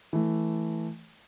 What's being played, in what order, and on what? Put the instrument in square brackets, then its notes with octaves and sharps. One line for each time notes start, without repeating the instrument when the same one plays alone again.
[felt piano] E3 A3